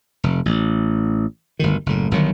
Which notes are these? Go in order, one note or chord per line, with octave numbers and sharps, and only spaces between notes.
F1
A1
G1 D2 D#3
F#1 A2
G1 D#3 F#3